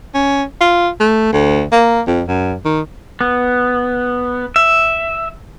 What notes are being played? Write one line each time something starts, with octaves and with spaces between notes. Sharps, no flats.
C#4
F4
A3
D2
A#3
F2
F#2
D#3
B3
E5